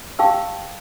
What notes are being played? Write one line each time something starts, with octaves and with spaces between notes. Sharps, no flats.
G4 F5 G5 A5 E6